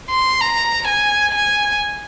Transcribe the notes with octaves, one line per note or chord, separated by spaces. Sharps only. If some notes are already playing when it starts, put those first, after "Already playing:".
C6
A#5
G#5
G#5